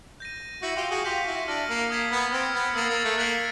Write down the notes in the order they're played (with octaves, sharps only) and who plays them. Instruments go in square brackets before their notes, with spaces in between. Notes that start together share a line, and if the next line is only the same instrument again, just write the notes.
[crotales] G6 A#6 D#7
[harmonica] E4 F#4 [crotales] G6 A#6 C#7
[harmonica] F4 G4
F#4 G#4
[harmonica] F4 G4 [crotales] G6 B6 D#7
[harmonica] E4 F#4
[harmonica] D4 E4 [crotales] F6 A#6 D#7 F#7
[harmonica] A#3
[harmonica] A#3 [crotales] D#6 G#6 B6
[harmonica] B3
[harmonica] C4 [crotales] F6 G#6 C#7
[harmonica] B3
[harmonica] A#3 [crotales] E6 A6 C#7
[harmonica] A#3
A3
[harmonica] A#3 [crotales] F#6 B6 D7 F#7